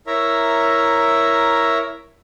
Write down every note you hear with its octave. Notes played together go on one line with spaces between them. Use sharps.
E4 A#4 C#5 E5 A#5